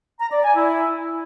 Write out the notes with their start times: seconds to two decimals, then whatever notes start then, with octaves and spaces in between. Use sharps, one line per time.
0.20 A#5
0.32 D5
0.44 G#5
0.55 E4